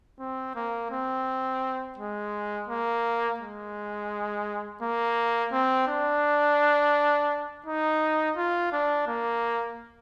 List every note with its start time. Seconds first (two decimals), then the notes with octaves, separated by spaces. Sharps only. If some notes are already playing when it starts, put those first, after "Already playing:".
0.20 C4
0.56 A#3
0.91 C4
1.98 G#3
2.68 A#3
3.40 G#3
4.82 A#3
5.52 C4
5.88 D4
7.66 D#4
8.37 F4
8.72 D4
9.08 A#3